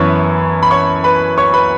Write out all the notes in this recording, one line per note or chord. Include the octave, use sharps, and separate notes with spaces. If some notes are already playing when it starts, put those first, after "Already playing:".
Already playing: F#2 E3 B3 E4 B4 C#5 A5 B5
B5
C#5 C#6
B4 B5
C#5 C#6
B4 B5